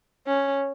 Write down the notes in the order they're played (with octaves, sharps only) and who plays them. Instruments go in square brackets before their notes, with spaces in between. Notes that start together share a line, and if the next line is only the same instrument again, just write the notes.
[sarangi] C#4